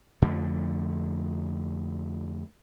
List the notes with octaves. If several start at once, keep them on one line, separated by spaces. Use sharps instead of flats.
F2 D3 A3